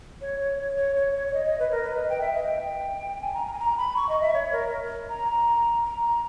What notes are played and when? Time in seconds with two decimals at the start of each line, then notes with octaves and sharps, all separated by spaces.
0.21 C#5
0.40 C#5
0.59 C#5
0.77 C#5
0.96 C#5
1.15 C#5
1.28 C#5
1.33 D#5
1.46 D#5
1.59 B4
1.71 A#4
1.83 B4
1.96 D#5
2.09 G5
2.21 E5
2.33 D#5
2.46 G5
3.21 G#5
3.34 A#5
3.47 A#5
3.54 G#5
3.59 A#5
3.77 B5
3.97 C#6
4.09 D#5
4.22 E5
4.34 C#5
4.52 A#4
5.09 A#5
5.84 A#5